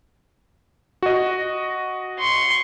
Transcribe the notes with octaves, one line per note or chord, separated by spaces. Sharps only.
F#4 D#5
C6 C#6